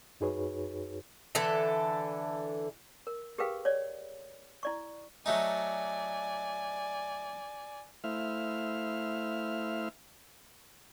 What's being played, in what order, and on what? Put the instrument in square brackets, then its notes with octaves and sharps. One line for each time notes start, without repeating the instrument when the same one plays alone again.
[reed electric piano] F#2 D#4 F#4 G#4 B4 C#5
[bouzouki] D3 E3 A4 E5
[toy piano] A#4
G4 G#4 A#4 B4 F5 G5
C#5 D5
E4 D5 C#6
[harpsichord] F#3 A3 D#4 [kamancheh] D5 G#5
[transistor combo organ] A3 E4 C5 E5 F5 F6